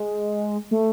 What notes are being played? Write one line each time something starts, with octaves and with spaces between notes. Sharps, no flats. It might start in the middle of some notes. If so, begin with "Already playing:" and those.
Already playing: G#3
A3